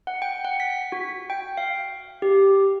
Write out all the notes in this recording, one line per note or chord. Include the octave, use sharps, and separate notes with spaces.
F#5
G5
F#5
B6
F#4
G5
F5
G4